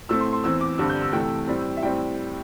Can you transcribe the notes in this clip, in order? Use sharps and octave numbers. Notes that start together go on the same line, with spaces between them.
A2 A3 C4 E6
C6
C6
E2 E3 C4 E6
D6
G2 D3 G3 C4 E6
G6
E6
C3 E3 A3 G5
A2 G3 C4
E5
A2 G3 C4 G5